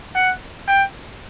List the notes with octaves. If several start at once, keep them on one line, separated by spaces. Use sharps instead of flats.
F#5
G5